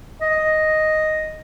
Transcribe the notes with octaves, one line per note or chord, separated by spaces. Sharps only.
D#5